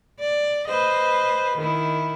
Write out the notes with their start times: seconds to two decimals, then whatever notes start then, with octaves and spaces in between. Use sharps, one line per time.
0.20 D5
0.68 B4 C5 D#5
1.58 D#3 E4